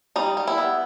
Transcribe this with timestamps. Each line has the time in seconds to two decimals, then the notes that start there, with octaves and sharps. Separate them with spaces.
0.16 G3 D#4
0.37 G3
0.47 E4
0.58 B3